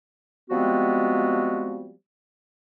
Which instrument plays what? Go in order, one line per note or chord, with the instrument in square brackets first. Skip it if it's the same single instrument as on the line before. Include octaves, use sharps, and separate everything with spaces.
[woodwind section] F3 G3 G#3 B3 C4 F#4